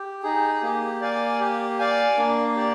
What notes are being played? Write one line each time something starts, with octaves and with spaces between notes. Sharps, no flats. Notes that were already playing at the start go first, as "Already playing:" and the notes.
Already playing: G4
D#4 G#4
A#3 G4
D5 F5 G#5
G4
D5 F5 G#5
A#3 D4
G4 D5